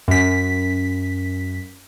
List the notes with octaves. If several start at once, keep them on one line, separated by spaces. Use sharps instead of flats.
F#2 B6